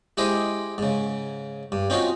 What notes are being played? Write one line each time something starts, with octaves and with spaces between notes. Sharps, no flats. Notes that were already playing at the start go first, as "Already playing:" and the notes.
G#3 E4 G4 G#4 C5 D#5
G#2 C#3
G2
C4 C#4 D#4 F4 F#4